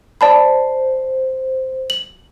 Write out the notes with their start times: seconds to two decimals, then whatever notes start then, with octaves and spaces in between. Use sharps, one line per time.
0.21 C5 D5 A5 B5
1.90 F#7